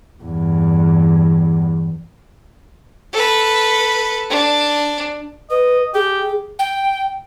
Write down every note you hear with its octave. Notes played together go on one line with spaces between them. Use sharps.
E2 G2
A4 B4
D4
B4 D#5
G4 G#4
G5